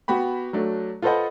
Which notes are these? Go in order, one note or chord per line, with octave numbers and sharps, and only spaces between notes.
B3 F#4 G4 B5
F#3 A3 D4
F4 A4 B4 C5 D#5 F#5